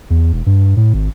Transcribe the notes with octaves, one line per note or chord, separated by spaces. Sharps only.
E2
E1
G2
A2
G#1